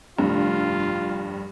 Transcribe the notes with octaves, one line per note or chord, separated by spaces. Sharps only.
F1 G2 F4